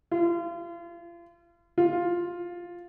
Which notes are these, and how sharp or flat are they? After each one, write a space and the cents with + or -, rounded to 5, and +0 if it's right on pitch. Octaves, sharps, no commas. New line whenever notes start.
F4 -35
F4 +5